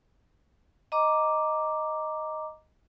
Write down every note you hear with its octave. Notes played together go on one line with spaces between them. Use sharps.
D#5 A#5 D6